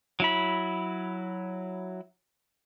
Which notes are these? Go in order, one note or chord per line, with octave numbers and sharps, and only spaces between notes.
F#3 E4 B5